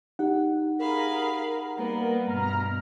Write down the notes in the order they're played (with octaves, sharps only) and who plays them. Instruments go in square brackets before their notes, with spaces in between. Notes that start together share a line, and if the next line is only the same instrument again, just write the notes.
[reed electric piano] D#4 [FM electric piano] G4 F#5
[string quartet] G#4 F5 B5 [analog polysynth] A#4
[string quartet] G3 A#3 B3
[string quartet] G2 B2 [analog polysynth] A#5 F6